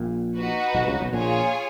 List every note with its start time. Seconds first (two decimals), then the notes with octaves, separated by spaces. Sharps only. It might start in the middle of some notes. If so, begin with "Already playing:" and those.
Already playing: A#1 A#2
0.36 D#4 F#4 B4
0.75 B1 B2
0.87 C#2 C#3
1.00 B1 B2
1.13 A#1 A#2 F4 G#4 C#5 G#5